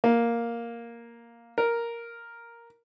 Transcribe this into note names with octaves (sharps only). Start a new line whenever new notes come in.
A#3
A#4